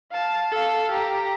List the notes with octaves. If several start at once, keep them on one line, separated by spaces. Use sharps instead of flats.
F5 A5
A4 F5
G4 A#5